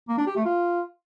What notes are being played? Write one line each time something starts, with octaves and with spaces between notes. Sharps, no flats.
A#3
D4
G4
A3
F4